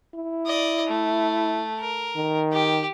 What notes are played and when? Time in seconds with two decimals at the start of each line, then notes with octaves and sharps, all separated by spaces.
0.14 E4
0.47 D5 D#5
0.87 A3
1.79 A#4
2.16 D#3
2.52 G4